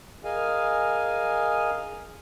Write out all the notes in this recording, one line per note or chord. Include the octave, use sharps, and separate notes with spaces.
G#4 A#4 D#5 F5 G#5